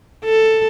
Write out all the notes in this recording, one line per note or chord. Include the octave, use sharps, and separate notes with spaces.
A4